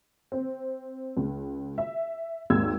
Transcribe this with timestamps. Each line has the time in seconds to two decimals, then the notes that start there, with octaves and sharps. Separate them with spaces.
0.32 C4
1.17 C#2
1.78 E5
2.50 G#1 D#2 G#2 E6 G#6